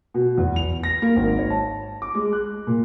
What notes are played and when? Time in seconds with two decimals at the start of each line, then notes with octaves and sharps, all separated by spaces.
0.14 B2
0.38 E2
0.56 F7
0.83 A#6
1.02 A#3
1.16 G#1
1.39 C#5
1.50 A5
2.02 D6
2.15 G#3
2.33 F#6
2.67 A#2